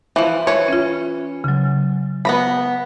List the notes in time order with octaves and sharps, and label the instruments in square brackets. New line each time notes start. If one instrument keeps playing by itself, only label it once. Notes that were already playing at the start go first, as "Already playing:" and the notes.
[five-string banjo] E3 F3
E3 C#5
[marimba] C#4 F4
C#3 F#3
[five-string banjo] B3 A#5 B5